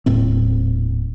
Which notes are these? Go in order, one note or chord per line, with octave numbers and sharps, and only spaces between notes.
D#1 A2 C4